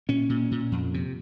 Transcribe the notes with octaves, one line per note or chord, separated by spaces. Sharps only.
A#2 C#4
A#2
A#2
F2
C3